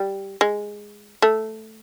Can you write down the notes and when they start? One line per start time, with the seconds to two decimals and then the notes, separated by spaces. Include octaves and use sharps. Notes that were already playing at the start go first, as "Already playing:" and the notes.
Already playing: G3
0.41 G#3
1.22 A3